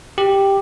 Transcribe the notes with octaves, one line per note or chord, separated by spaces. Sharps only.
G4